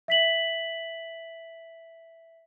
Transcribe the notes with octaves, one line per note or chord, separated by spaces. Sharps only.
E5 B6 F#7